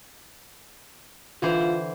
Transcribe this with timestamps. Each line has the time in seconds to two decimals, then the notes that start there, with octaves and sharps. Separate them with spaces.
1.42 D3 E3 F4 C5